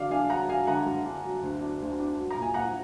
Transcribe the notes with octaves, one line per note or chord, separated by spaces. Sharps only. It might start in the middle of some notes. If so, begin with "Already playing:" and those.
Already playing: D3 F#3 D4 D5 F5
D4 F5 G#5
F#3 F#5 A#5
F#3 F5 G#5
D3 F#5 A#5
D3
D4
F#3
D2
D4
D2
D4
F#3
A#5
A#2
G#5
A#2 F#5 A#5